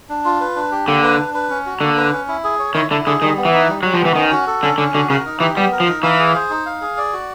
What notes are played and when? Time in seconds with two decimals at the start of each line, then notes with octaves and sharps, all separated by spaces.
0.09 D4
0.25 F4
0.40 B4
0.56 D4
0.72 G4
0.87 D3 A#3
1.03 B4
1.19 D4
1.34 B4
1.50 C#4
1.66 F#4
1.81 D3 A#3
1.97 B4
2.13 C#4
2.28 E4
2.44 G#4
2.59 C#5
2.75 D#3 E4
2.91 D3 E4
3.06 D3 G#4
3.22 D#3 G3
3.37 B3
3.45 E3
3.53 D#4
3.69 G3
3.83 F#3 G3
3.94 F3
4.00 B3
4.05 E3
4.15 D#3 C#4
4.32 F#4
4.47 A4
4.63 D3 C#4
4.78 D3 C#4
4.94 D3 F#4
5.09 C#3 A#4
5.26 D#4
5.40 E3 G4
5.56 G3 B3
5.72 A#4
5.80 F3
5.88 D#4
6.03 E3 F5
6.19 G#4
6.35 C5
6.50 D#4
6.66 F5
6.81 G#4
6.97 D5
7.13 F#4